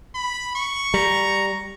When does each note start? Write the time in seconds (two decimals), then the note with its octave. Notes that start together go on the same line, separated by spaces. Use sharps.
0.15 B5
0.55 C#6
0.94 G3 A#5